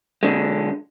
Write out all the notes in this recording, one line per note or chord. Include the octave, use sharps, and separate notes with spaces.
B1 D3 G#3